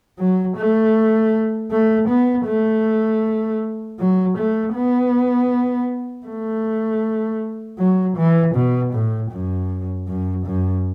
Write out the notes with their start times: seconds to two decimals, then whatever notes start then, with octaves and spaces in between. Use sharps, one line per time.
0.18 F#3
0.57 A3
1.71 A3
2.08 B3
2.46 A3
3.99 F#3
4.37 A3
4.75 B3
6.27 A3
7.79 F#3
8.17 E3
8.55 B2
8.93 A2
9.31 F#2
10.07 F#2
10.46 F#2